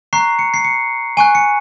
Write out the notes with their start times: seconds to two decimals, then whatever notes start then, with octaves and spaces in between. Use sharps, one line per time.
0.13 A#5 C#6 F#6 C7
0.39 C#7
0.54 C7
0.65 C#7
1.17 G#5 C#6 F#6 D#7
1.35 C#7